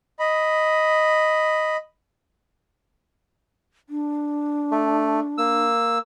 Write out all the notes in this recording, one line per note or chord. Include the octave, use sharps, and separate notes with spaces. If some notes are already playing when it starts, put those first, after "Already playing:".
D#5 B5
D4
A3
A#3 E6